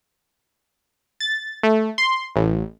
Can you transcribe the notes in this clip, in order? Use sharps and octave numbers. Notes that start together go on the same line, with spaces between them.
A6
A3
C6
A1